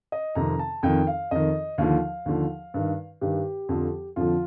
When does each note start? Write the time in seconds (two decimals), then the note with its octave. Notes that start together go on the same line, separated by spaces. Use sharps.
0.12 D#5
0.35 F2 C3 D#3 A#5
0.59 A5
0.83 F2 D#3 G5
1.07 F5
1.31 F2 D#3 D#5
1.78 D#2 D3 F3 F5
2.26 D#2 D3 F3
2.74 G2 D#3
3.21 G2 D#3 G4
3.69 F2 D3 F3
4.16 F2 D3 F3 F4